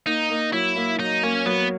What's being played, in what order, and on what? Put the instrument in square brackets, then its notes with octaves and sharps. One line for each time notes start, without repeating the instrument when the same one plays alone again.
[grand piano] A#3 [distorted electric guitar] D#4
[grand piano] A#3
[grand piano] F#3 [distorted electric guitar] E4
[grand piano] A#3
[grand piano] F#3 [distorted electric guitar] D#4
[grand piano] A#3 [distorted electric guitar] C#4
[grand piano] F#3 [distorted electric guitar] B3